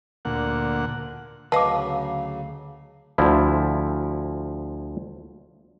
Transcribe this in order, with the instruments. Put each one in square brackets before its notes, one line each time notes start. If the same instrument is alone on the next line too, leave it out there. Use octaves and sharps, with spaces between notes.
[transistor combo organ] D2 A#2 F#5
[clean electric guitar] D2 F5 [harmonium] C#3 F#3 [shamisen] B4 D#5 [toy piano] A5 D6
[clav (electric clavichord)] D2 F3 E4